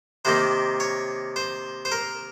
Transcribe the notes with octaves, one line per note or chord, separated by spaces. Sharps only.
C3 D#3 A#3 C5
C#5
C5
C5
A#4